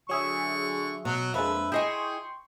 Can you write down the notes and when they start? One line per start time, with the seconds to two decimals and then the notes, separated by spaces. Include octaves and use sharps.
0.09 D3 F#3 G#4 E5 C#6
1.05 B2 F#3 F#5
1.34 F2 G#3 A#3 D4 B4 E5
1.72 E4 G#4 D#5 G5 G#5 C6 C#6